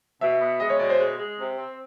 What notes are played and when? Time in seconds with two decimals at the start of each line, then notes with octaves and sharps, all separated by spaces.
0.21 B2 E5
0.41 B3
0.60 G#3 D#5
0.70 C#5
0.79 B2 D5
0.89 C5
0.99 G#3
1.18 G#3
1.37 C3
1.57 C4